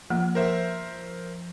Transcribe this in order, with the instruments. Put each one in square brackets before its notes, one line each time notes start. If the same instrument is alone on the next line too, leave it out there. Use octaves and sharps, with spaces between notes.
[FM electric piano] F3 [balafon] A#3
[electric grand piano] A#4 C5 E5